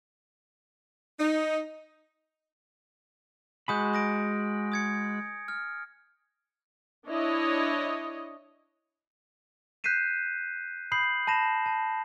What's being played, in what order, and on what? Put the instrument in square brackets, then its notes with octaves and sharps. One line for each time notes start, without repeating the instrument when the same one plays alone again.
[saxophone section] D#4
[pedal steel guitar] G#3 F#4 B5 [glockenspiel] G#5 D#6 G6
[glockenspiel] D#6 A#6 D7
D#6 G#6 C#7
F6
[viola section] D4 E4 C#5 D#5
[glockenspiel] F#6 G6 B6 C7 D#7 E7
B5 D#6 G6 C7 F#7
A5 B5 A#6 E7
A5